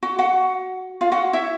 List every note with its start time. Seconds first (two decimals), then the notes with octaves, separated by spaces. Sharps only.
0.03 F#4 F#5
0.19 F#4 F#5
1.01 F4 F5
1.12 F#4 F#5
1.33 E4 E5